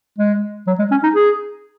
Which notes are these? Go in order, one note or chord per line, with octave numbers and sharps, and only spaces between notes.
G#3
F#3
G#3
C#4
D#4
G#4